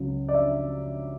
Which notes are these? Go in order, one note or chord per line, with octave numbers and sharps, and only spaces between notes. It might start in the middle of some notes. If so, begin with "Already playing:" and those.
Already playing: C#2 C#3 F#3
D5
E5